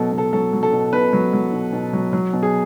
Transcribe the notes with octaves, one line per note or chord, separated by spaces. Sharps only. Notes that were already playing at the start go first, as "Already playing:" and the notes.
Already playing: B2 F#3 A4
B2
A4
F#3 A4
F#3
A4
B2
B2 B4
F#3
F#3
B2
B2
F#3
F#3
B2
G#4